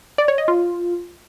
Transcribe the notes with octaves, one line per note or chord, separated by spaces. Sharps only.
D5
C#5
D#5
F4